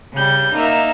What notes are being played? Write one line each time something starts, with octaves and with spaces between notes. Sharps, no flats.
C#3 G3 G6
A#3 D#4 E5